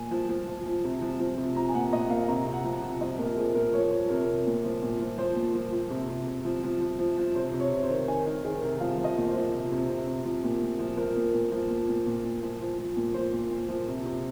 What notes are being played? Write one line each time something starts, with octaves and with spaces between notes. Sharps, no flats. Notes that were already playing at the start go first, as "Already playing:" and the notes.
Already playing: A#2 G#5
F3
F3
F3
F3
C3
F3
F3
C3
F3 A#5
G#5
A#2 F#5
A#2 D#5
A#2 F5
C3 A#5
C3
F#5
F3
C3
F3 D#5
A#2 A#4
F3 G#4
A#2 A#4
F3 C#5
F3
C3 A#4
C3
A#2
F3
A#2
F3
F3 C5
A#2
F3
F3
C3
C3
C3
F3
F3
F3
F3
F3
C3 C5
C3
C#5
C3
C5
D#3
D#3 G#5
D#3 A#4
D#3 G#4
C3 A#4
F3 F5
F3
D#5
A#2
C5
F3
C3
C3
C3
C3
F3
A#2
A#2
F3
F3 A#4
A#2
A#2
F3
A#2
A#2
A#2
A#2
F3
F3
F3
A#2
F3 C5
A#2
A#2
F3
C3
C3